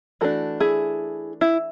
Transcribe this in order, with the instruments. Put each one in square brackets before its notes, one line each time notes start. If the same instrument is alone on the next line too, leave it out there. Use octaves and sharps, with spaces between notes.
[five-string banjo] E3 A3 D4 F#4 A4
E4 G#4
E4